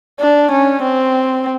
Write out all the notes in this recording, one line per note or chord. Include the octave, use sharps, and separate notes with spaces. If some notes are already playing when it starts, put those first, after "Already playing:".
D4
C#4
C4